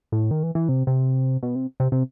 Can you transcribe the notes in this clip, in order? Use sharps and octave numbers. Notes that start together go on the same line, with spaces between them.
A2
D#3
E3
E3
C3
C3
B2
C3
C3
C3